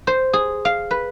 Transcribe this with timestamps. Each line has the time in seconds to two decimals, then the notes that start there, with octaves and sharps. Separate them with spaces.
0.07 C5
0.33 G#4
0.65 F5
0.91 B4